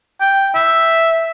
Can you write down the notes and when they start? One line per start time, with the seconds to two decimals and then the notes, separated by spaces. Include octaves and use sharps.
0.21 G5
0.55 E5